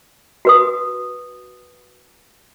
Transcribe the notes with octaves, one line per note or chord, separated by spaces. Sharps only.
F#4 B4 D#6